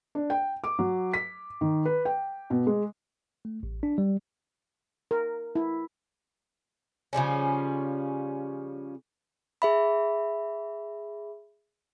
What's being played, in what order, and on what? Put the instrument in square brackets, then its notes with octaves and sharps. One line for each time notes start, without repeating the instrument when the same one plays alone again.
[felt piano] D4
G5
D6
F#3
B6
D#3
B4
G5
B2
G#3
[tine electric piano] A3
A1
D4
G3
[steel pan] A#4
E4
[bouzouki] C#3 F3 G3 C#4
[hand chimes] G#4 E5 B5